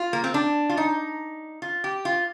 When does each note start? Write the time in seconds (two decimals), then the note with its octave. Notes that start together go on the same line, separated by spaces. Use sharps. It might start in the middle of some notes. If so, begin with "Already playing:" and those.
Already playing: F4
0.13 A#3
0.24 C4
0.34 D4
0.69 F4
0.77 D#4
1.62 F4
1.84 G4
2.05 F4